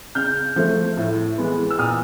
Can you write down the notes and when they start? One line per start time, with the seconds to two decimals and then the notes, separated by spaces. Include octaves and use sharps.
0.15 C#3 F6 G6
0.56 F3 A3
0.97 A2
1.38 E3 G#3 B3
1.71 E6
1.79 A#2 D#6 F6